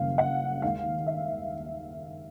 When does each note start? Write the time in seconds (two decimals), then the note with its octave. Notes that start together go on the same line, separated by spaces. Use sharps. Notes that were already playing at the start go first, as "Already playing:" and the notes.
Already playing: F#1 F#2 D#3 G3 F5
0.18 F#5
0.62 D#2 D#3 G#3 F5
1.06 E5